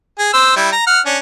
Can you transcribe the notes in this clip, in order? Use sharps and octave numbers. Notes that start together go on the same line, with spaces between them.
G#4
C5 E6
G3 E4
A#5
F#5 F6
C#4 D4